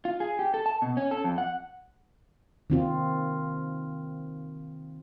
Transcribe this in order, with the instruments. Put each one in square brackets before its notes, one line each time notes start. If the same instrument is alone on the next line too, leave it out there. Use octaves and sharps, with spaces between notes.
[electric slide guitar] F4
G#4
G4
A4
A5
B2
C#4
A4
F2
F#5
[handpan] D#3 C4 F4